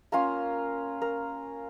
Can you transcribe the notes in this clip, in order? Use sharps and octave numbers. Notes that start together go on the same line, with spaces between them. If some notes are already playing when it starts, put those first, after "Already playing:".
A#3 C#4 F4 A#4
A#4